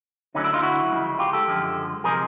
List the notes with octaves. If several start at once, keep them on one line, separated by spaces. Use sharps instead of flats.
D2 D3 F#3 C#4 D#4
D4 E4
D#4 F4
E4 F#4
C#2 C#3 F3 G#3
F4 G4
G4 A4
F#2 D3 F3 G#3
C3 F3 G#3 G#4 A#4